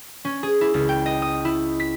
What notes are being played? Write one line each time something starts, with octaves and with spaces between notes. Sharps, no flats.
C#4
G#4
E4
C#2
G5
D#5
D#6
E4
B6